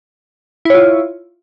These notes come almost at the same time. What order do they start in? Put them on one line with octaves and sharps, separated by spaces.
E4 C#5 F4